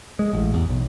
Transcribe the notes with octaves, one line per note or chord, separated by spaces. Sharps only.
G#3
A1
E2
B1